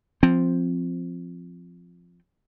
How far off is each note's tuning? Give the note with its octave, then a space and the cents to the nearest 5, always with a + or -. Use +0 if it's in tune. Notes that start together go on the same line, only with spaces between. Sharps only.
F3 +0 C4 +0